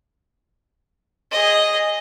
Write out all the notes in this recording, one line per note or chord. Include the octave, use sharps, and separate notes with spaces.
G#4 D#5